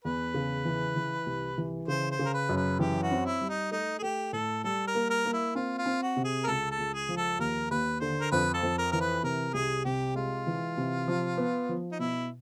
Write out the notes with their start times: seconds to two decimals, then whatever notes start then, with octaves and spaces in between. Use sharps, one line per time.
0.04 E2 B4
0.34 C#3
0.65 E3
0.96 E3
1.26 C2
1.58 E3
1.88 C#3 C5
2.11 C5
2.19 C#3
2.25 A#4
2.34 B4
2.49 F#2
2.57 B4
2.79 E3 G4
3.03 F#4
3.11 C4
3.26 E4
3.41 G3
3.49 D#4
3.71 A3 D#4
3.99 G#4
4.02 A3 G4
4.33 A2 A4
4.64 G3 A4
4.87 A#4
4.95 A#3
5.10 A#4
5.25 A#3
5.33 E4
5.55 C4 F4
5.78 F4
5.86 C4
6.02 F#4
6.17 C3
6.25 G#4
6.44 A#4
6.47 C#2 A4
6.71 A4
6.79 C#2
6.94 G#4
7.09 F3
7.17 A4
7.39 D#2 A#4
7.71 D#2 B4
8.01 D3 C5
8.21 A#4
8.32 F2 B4
8.54 A4
8.63 F2
8.78 A#4
8.92 E3 A#4
9.01 B4
9.23 C3 A#4
9.54 C2 G#4
9.85 C3 G4
10.15 G#3 F4
10.47 E3
10.77 C3
11.08 F3
11.37 B3
11.69 F3
11.92 D#4
11.99 B2 E4